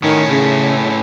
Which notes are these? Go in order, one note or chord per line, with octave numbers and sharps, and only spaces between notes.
A2 D#3 C#4
C#3